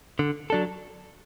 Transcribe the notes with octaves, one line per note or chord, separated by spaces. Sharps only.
D3
F#3 D4 A4